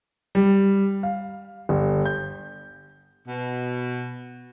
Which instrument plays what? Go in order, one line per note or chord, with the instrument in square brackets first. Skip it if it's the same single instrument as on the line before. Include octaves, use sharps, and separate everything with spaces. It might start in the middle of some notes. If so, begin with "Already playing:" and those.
[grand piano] G3
F5
G1
G6
[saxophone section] B2